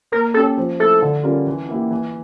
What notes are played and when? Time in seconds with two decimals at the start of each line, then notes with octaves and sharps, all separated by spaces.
0.12 A#3 A#4
0.34 C#4 G4 A4 C#5
0.58 F3
0.80 A3 E4 A4
1.02 D3
1.23 G3 C#4 F4 A#4
1.47 E3
1.69 A#3 E4 G4
1.91 E3